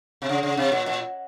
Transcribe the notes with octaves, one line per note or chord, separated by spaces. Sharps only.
C3
C#3
C#3
C3
A#2
A#2